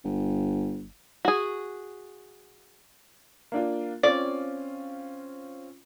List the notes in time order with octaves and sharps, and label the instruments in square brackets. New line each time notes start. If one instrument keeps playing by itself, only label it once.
[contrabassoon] G1
[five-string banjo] F#4 G#4
[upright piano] A#3 D4 F4
[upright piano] C4 C#4 F4 [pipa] D5